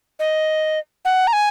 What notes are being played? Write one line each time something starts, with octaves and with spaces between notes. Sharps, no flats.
D#5
F#5
A#5
G#5